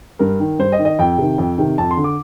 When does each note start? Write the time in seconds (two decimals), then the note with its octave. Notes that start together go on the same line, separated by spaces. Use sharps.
0.19 G2 A#4
0.40 D#3
0.59 G2 C5
0.72 D#5
0.79 D#3
0.85 D#5
0.99 F2 G5
1.18 C3 D#3
1.38 F2
1.58 C3 D#3
1.78 F2 A5
1.91 C6
1.97 D3
2.04 D6